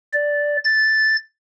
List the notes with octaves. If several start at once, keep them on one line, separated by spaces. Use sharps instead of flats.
D5
A6